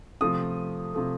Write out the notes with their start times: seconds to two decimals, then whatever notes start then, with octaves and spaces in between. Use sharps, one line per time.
0.21 C3 F3 A3 D#6
0.94 C3 F3 A3